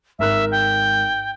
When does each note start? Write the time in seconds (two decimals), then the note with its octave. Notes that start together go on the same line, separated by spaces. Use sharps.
0.19 G#1 A#4 E5 F#6
0.52 G5